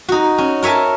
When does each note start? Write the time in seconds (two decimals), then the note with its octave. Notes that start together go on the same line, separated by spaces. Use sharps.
0.09 D#4 F#4
0.38 C#4
0.63 A#4 C#5 E5 G#5 A5